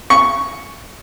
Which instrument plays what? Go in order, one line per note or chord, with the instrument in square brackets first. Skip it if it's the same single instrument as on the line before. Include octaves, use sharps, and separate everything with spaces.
[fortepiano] C#6